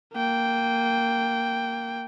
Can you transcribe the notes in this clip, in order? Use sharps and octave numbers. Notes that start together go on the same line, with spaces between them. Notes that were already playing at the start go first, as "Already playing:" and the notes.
A#3 G5